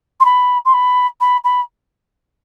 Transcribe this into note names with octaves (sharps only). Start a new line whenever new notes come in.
C6
B5
C6
B5
B5
B5